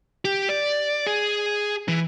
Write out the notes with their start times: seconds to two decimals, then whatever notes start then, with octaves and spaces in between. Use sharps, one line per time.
0.25 G4
0.49 D5
1.06 G#4
1.88 E3